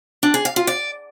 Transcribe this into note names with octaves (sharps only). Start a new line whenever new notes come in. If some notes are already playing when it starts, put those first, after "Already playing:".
D4
G#4
F5
F4
D5